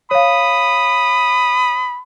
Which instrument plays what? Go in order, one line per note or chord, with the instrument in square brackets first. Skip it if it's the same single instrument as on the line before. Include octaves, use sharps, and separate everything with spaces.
[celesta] C#5 F5 [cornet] B5 [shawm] D#6